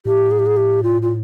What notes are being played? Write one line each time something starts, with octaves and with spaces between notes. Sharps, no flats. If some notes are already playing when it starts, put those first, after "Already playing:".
A2 G4
G#4
G4
G#4
G4
F4
F4